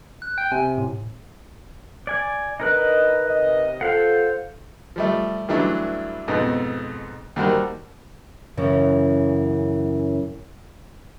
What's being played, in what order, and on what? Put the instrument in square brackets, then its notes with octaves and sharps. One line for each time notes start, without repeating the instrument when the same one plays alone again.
[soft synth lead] F#6
[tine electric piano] G5
[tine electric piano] C3 [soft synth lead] G#5
[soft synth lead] A2
[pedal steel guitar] D5 G#5
[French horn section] D#3 D4 D#5 [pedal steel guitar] D#4 A#4 B4
[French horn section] C3 D#5
[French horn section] F4 A4 [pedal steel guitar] C5 F5 F#5
[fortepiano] F3 G3 A3
G2 E3 F#3 A3 D4
F2 G#2 B2
D#2 G3 F#4 A#4 C5
[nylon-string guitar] F#2 C#3 E3 C#4